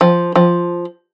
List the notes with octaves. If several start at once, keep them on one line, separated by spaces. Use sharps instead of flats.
F3
F3